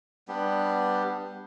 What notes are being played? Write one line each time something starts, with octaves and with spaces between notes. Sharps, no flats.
G3 B3 D4 G4